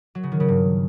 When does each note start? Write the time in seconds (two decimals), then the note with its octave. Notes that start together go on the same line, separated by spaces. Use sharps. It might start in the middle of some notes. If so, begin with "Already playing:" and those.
0.15 F#3
0.23 C#3
0.32 D#3
0.40 C#3
0.48 G2